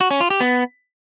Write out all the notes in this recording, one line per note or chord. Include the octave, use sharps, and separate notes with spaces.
F#4
C#4
F4
G4
B3